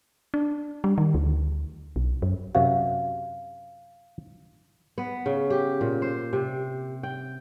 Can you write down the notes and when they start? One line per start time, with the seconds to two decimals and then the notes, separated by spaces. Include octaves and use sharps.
0.34 D4
0.84 G3
0.98 D#3
1.15 D2
1.96 B1
2.22 F#2
2.55 F#2 C3 F#4 F5
4.98 B3
5.26 C#3
5.50 G4
5.81 A#2
6.02 C5
6.33 C3
7.03 G5